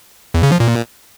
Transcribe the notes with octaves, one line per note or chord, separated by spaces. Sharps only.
E2
C#3
F3
A#2